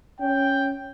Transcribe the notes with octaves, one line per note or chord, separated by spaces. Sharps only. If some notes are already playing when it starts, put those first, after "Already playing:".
C#4 G5